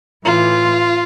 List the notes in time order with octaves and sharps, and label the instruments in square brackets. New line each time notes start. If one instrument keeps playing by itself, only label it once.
[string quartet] A2 E3 F4